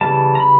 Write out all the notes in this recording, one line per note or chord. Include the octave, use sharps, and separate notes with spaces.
C#3 E3 G3 A5
A#5
B5